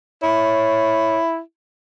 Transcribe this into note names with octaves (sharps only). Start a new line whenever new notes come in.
E4 C#5